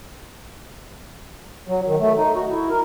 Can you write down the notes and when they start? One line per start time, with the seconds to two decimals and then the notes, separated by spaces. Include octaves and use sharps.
1.68 F#3
1.87 D#3
2.00 A3
2.18 D#4
2.35 F#4
2.50 E4
2.70 A#4